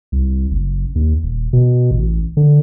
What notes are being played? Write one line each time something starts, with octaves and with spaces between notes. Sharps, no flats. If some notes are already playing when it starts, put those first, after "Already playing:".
C2
F#1
D#2
D#1
B2
A1
D3